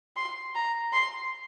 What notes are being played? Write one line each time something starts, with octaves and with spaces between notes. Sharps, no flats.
C6
A#5
C6